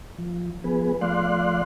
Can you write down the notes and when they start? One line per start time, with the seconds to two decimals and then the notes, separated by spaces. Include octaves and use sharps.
0.18 F3
0.64 F3 B3 G#4 B4
1.01 F3 A3 D5 F5 C6 F#6